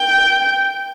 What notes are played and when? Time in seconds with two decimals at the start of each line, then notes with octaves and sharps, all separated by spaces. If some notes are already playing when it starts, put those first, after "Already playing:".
Already playing: G5